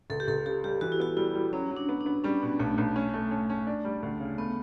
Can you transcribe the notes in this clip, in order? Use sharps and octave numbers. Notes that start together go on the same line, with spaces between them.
C#2 A4
G4
C#2 A4
C#3 G4
G3 G4
E3 F#4
E4
B3 F#4
G3 E4
G3
F#3 C#4
F#3
D4
B3
D4
B3
G3 C#4
B2
B1 A3
B1
C#4
A3
C#4
C#4
D4
G3
D2
C#3
A3 B3